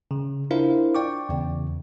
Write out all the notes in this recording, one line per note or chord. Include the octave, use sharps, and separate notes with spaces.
C#3
D4 E4 F4 A#4 C5 F5
D5 G5 C#6 D6
E2 C#3